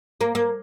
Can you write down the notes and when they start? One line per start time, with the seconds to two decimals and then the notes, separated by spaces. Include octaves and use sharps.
0.21 A#3
0.35 A#3